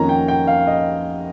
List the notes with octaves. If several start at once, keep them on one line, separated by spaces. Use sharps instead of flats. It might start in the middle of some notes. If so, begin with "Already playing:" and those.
Already playing: F2 D#3 A#3 C#4 A#5
G5
G5
F5
D#5